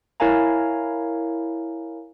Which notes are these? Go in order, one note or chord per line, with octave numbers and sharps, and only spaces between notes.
E4 A#4 C#5 F5 G#5 A#5